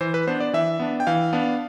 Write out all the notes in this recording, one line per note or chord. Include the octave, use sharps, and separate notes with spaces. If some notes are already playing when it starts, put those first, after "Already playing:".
E3 C5
B4
B3 D4 C5
D5
E3 E5
B3 D4
G5
E3 F5
B3 D4